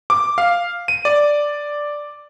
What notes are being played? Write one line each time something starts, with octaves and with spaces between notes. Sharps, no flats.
D6
F5
D#7
D5